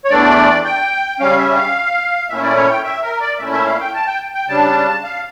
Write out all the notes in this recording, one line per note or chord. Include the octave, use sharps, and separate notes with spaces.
C#5
E2 E3 A3 D4 D5
G5
C#3 G3 C#4 F5
E5
F5
A#2 A3 C#4 E4 E5
D5
C#5
G5
E5
A#4
D5
A#2 A3 C#4 E4 E5
E5
F5
G5
A5
G5
G5
C#3 G3 D4 A5
F5